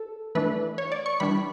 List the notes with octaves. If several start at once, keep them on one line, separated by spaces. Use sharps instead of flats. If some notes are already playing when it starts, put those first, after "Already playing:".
Already playing: A4
E3 A3 D4 B4
C#5
D5
C#6
E3 G3 D4 B5